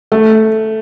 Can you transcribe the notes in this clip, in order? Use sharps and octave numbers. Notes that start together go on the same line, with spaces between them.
A3